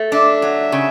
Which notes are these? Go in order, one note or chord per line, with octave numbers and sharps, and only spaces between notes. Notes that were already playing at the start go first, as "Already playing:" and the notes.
Already playing: A3
D4 E5
F#3
C#3